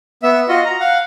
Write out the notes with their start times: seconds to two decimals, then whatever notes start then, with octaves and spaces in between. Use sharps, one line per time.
0.23 B3 E5
0.49 F4 F#4 D#5
0.65 A#5
0.80 F5 F#5